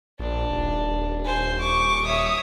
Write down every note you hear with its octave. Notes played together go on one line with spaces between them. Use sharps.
A#1 D4
D#1
C5 G#5
C#6 D6
C#5 E5 D#6